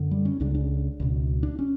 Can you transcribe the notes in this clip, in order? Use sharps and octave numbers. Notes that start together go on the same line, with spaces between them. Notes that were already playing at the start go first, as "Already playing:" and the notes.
Already playing: F#2 D3
G3
C#4
C#2 C#3 D4
D4
C#2 B2
D4
C#4